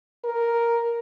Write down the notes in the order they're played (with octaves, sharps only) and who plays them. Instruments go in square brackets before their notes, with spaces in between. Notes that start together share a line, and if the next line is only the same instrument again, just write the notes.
[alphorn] A#4